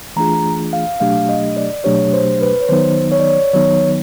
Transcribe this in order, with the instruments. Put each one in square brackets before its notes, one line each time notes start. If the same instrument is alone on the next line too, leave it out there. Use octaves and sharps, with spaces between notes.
[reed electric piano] E3 A3 D4 F4 G#4 [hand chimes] A#5
[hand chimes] F5
[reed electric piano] B2 F#3 A3 D4 G4 [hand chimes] F5
[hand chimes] D#5
D5
[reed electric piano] B2 F#3 A3 D4 G4 [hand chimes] C#5
[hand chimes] C5
B4
C#5
[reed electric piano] D#3 F#3 B3 D#4 [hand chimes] C5
[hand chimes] C#5
D5
C#5
[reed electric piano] D#3 F#3 B3 D#4 [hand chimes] C#5